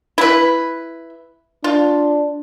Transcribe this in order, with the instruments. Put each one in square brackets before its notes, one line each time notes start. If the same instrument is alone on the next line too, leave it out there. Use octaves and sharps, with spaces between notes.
[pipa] E4 B4
[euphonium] D4 [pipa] F4